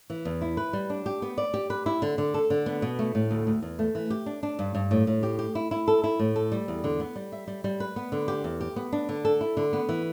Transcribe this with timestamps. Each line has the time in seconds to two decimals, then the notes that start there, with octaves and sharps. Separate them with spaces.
0.10 E3
0.25 E2
0.41 E4
0.57 B4
0.73 G3
0.90 D4
1.06 G4
1.22 B3
1.38 D5
1.54 G4
1.70 B4
1.86 E4
2.02 D3
2.18 D3
2.34 A4
2.50 D3
2.66 B3
2.82 B2
2.99 A3
3.15 A2
3.31 D2
3.47 D2
3.62 E2
3.79 A3
3.95 E3
4.10 G4
4.26 D4
4.43 D4
4.59 G2
4.75 G2
4.91 A2
5.07 A2
5.23 G4
5.39 G4
5.55 E4
5.71 E4
5.88 A4
6.04 E4
6.19 A2
6.36 A4
6.52 G3
6.68 E2
6.84 D3
7.00 B3
7.16 G3
7.32 E5
7.48 G3
7.64 G3
7.80 B4
7.96 B3
8.12 D3
8.28 G4
8.44 E2
8.60 G4
8.76 B3
8.92 D4
9.09 D3
9.25 A4
9.41 E4
9.57 D3
9.73 B3
9.89 E3